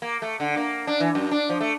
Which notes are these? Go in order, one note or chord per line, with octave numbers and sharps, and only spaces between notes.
A#3
A3
D3
A#3
D4
E3
F#2
D4
F3
A3